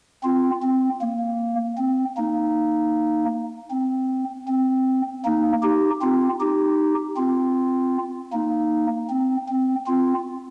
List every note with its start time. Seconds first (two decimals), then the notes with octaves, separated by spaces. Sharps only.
0.23 C4 F4
0.62 C4
1.01 A#3
1.78 C4
2.17 A#3 D#4
3.71 C4
4.48 C4
5.25 A#3 D#4
5.63 D#4 G4
6.02 C4 F4
6.40 D#4 G4
7.17 C4 F4
8.32 A#3 D#4
9.10 C4
9.49 C4
9.87 C4 F4